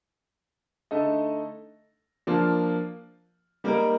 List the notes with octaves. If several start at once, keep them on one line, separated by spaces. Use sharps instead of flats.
D3 A3 D#4 A4 D#5
F3 A#3 D4 F4
G3 A#3 D#4 A#4